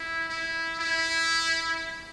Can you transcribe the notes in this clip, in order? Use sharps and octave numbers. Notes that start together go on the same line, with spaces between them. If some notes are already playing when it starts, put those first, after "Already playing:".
Already playing: E4
E4
E4